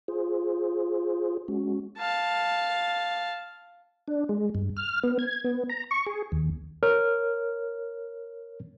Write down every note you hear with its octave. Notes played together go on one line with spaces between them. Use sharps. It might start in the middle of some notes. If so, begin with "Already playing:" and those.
F4 G#4 C5
G#3 C#4 F#4
F5 A5
D4
G#3
G2
F6
B3
G#6
B3
A#5
C#6
G#4
D#2
A#4 C#5 F6